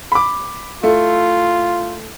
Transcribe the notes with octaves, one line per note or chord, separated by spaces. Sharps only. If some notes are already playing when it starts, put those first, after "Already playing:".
B5 D6
A3 E4 F4